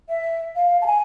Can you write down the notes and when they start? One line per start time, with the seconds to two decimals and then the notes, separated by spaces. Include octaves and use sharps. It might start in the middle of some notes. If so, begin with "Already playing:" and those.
0.09 E5
0.56 F5
0.82 A5
0.86 G#5